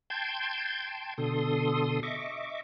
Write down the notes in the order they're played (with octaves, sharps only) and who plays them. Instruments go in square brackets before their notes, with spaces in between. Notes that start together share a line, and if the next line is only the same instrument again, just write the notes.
[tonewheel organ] G5 A5 C6 G6 G#6
B2 D3 A4 C6 D#6
D#5 E5 C#6 D6